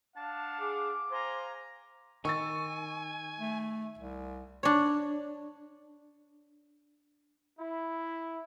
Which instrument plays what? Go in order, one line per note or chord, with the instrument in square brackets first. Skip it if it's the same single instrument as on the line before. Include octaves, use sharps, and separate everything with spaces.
[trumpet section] D4 F5 F#5 [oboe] A5
[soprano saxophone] G#4 [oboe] D6
[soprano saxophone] C5 [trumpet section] F5 G#5 A#5
[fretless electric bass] D#3 [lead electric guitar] G#5 [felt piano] C#6 E6 A6
[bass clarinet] A3
C2
[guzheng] D4 C#5
[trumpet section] E4